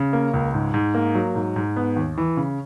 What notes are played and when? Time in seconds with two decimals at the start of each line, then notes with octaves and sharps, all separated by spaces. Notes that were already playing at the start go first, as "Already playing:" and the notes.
Already playing: C#3
0.13 A#3
0.34 C#2
0.54 G#2
0.74 G#2
0.94 A#3
1.15 F#3
1.35 G#2
1.56 G#2
1.76 B3
1.96 D#2
2.18 E3
2.37 C#3